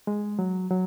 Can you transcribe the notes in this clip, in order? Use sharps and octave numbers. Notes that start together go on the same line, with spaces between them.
G#3
F#3
F#3